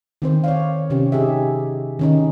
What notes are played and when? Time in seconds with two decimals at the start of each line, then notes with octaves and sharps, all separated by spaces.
0.22 D#3 C4 C5
0.44 C#5 D5 F5
0.90 C3 C#4 G4
1.12 D#4 G4 G#4 E5
1.99 D#3 C#4 D#4